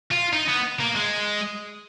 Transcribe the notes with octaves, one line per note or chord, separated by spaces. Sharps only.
F4
D#4
B3
A#3
G#3